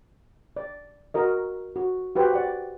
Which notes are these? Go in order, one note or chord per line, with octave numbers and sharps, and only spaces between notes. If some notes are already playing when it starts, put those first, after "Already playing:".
D5
F#4 A#4 D#5
F#4
F#4 G4 B4 C5
D5 F#5